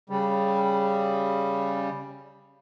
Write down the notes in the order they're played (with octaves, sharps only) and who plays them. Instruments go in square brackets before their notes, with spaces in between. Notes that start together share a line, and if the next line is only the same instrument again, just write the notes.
[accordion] C#3 G3